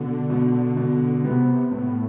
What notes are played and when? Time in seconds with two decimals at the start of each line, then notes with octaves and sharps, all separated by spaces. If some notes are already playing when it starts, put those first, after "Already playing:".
Already playing: B2 D3
0.29 B2 D3
0.77 B2 D3
1.24 C3 B3
1.71 A2 B3